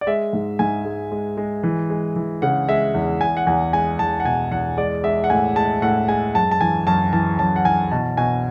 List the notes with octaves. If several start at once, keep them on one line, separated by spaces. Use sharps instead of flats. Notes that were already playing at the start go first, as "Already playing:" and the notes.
D5
G#3 E5
G#2
G#2 G#5
G#3
G#3
G#3
E3
G#3
E3
C#3 F#5
G#3 E5
E2
E2 G#5
F#5
E2 G#5
G#3 G#5
E2 A5
F#5
B2 G#5
E2 F#5
G#3 D5
G#3 E5
F#5
A2 G#5
G#3 A5
A2 F#5
G#3 G#5
F#2 A5
A5
E3 G#5
F#2 A5
E3 A5
F#2 A5
F#5
E3 G#5
B2 A5
B2 G#5